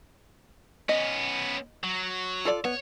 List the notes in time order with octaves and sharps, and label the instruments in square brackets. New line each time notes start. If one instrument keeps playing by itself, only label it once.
[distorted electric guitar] B3 C#4 [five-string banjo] D#5
[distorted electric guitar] F#3
[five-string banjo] F4 A4 D5
[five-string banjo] B3 [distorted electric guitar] C#5